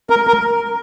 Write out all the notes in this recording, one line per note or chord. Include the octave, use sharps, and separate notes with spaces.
A#4
A#4